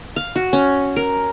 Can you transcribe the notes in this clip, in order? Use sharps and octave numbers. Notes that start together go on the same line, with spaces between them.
F5
F#4
C#4
A#4